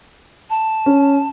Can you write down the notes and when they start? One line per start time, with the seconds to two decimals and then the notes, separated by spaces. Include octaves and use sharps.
0.50 A5
0.86 C#4